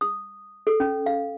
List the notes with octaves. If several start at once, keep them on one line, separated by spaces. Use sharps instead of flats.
D#6
A4
C#4
F5